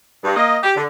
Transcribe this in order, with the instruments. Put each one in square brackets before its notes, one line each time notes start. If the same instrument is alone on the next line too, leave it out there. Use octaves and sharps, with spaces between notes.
[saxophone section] G2
A#3 D#5
G4
D3